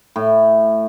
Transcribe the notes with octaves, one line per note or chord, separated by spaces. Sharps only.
A2